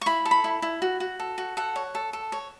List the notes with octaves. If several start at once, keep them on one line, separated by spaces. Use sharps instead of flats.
C#6
E4 B5
A4
B5
E4
E4
F#4
F#4
A4
F#4
A4 F#5
C#5
A4
A4
C#5